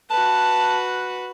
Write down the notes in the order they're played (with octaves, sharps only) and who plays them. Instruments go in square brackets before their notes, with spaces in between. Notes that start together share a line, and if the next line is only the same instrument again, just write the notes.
[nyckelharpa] F#4 B4 [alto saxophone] A5